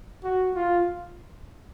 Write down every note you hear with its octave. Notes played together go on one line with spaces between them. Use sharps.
F#4
F4